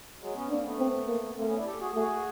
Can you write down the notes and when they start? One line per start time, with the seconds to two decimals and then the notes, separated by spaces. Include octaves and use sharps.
0.21 F#3 G#3
0.35 B3 C#4
0.50 A#3 C4 D4
0.64 A3 B3
0.79 C4
1.08 A#3
1.37 A3 A#3 C4
1.46 B3 C#4
1.56 D4 E4
1.65 G4 A4
1.80 F#4 G#4
1.95 A3 F#4 G#4